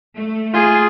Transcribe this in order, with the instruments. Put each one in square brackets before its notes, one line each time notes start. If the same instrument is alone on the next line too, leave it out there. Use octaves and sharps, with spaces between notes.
[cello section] A3
[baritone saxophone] F4 [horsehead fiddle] G#4